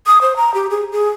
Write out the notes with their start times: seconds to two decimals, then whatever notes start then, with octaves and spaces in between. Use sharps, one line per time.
0.06 D#6
0.21 C5
0.36 A#5
0.54 G4
0.70 G#4
0.92 G#4